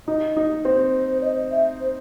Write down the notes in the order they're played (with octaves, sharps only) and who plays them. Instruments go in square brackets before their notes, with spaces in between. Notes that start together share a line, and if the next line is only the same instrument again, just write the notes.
[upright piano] D#4 [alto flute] D#5
[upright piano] D#4
C4
[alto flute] C5
C5
D#5
E5
C5